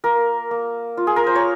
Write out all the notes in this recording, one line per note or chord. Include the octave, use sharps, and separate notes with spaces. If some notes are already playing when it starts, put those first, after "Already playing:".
A#3 A#4
A#3
F4
G#4
A#4
C5
C#5